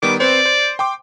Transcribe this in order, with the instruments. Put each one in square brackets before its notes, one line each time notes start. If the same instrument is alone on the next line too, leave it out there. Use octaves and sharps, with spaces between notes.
[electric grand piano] D#3 G3 B3 [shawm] D6
[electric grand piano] C4 B4 C5 [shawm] D5
[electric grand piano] C5
G5 C6 D6